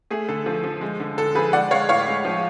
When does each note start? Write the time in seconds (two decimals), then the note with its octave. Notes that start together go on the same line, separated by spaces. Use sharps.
0.11 A3 G#4
0.29 D3 A4
0.46 F3
0.64 F3
0.81 G#3
1.00 D3
1.18 D3 A4
1.35 F3 G#4 B4
1.53 G#3 D5 F#5
1.71 G#3 C#5 F5
1.89 A2 C#5 F5
2.07 G#3
2.25 F3